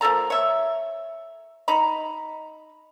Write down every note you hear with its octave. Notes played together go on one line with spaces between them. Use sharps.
F3 A#3 A4 A#5
C#5 E5
D#4 A#5 B5